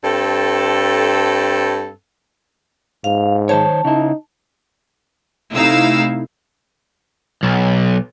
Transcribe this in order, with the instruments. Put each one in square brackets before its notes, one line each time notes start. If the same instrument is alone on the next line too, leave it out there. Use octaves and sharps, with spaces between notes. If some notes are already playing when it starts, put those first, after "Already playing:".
[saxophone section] G2 C4 A4
[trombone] G#2 [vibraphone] F5
[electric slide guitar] D#3 C5 C#5 [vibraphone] A5
[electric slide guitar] C#3 E4 [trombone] D#4
[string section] C3 A3 D#4 E4 F5 E6
[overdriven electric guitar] B1